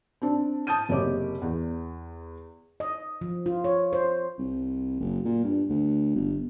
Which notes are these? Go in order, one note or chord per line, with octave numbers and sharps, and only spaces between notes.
C4 D4
A5 D#6 G6 D#7
F#1 C3 A#3 G4 C#5 D6
E2
D#5
F3
F4
C#5
C5
C2
F#1
A#2
G2
D2
G1